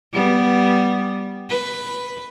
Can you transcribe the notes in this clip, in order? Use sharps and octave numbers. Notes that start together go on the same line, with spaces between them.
G3 B3
B4